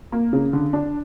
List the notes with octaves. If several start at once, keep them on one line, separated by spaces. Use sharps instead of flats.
A#3
C#3
D3
D4